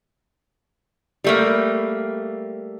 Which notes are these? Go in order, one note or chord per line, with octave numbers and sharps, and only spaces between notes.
G3 A3 A#3